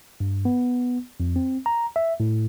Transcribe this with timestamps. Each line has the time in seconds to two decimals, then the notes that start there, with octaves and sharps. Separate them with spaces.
0.20 G2
0.45 B3
1.20 F2
1.36 C4
1.66 A#5
1.96 E5
2.20 A2